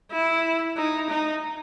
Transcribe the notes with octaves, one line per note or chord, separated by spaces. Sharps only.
E4
D#4
D#4